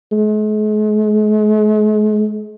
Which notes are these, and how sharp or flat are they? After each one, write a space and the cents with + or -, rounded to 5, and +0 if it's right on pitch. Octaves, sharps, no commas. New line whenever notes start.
G#3 +45